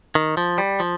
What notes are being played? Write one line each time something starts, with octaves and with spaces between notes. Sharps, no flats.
D#3
F3
G3
F3